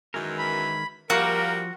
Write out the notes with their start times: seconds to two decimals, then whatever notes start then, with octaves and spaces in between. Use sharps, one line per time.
0.14 F#2 D#3 E3 G#3 A#4
0.38 B5
1.10 F3 G3 A#3 F#4 A#4